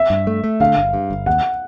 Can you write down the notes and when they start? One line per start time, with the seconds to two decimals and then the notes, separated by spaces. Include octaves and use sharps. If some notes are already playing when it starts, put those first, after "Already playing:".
Already playing: E5
0.10 G2
0.27 A3
0.44 A3
0.60 D3 F5
0.77 G1
0.94 G2
1.10 G1
1.26 D#2 F#5